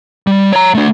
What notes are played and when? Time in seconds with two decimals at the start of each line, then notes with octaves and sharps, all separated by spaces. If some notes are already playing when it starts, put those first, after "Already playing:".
0.27 G3
0.52 C#5 A#5
0.74 A3 D4